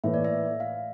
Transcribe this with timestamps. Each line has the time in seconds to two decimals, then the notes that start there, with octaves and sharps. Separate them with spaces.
0.04 A2 E3 A#3 E5
0.14 D5
0.24 E5
0.60 F5